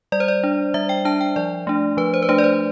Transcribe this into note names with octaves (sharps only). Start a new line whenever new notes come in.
G3 D5
C5
D5
D4
G3 E5
G5
D4 A5
G5
F3 D5
A3 D4
F3 B4
C5
B4
A3 D4 C5
D5
C5